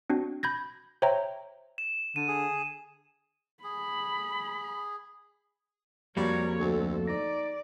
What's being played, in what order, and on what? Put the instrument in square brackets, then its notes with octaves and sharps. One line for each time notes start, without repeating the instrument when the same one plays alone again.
[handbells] C4 D4 F#4
B5 G6 G#6 A#6
C5 C#5 E5 G5 A#5
[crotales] E7
[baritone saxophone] D3 [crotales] D#7
[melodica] G#4
[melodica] G#4 [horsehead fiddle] B5
[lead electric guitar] F2 [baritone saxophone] G3 [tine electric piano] A#3 F#4 [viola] A#4 C#5
[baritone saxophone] D2 [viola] A4
[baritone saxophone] D#4 [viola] D5 [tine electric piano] A#6